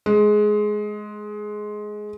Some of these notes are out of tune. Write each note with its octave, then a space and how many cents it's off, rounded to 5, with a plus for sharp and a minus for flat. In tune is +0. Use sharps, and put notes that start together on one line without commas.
G#3 +15